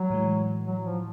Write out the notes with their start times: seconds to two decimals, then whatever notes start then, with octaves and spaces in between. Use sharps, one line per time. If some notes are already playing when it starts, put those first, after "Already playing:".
Already playing: F#3
0.10 A2 E3 G#3
0.66 F#3
0.85 F3